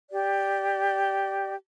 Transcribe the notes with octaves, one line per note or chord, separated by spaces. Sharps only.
G4 D5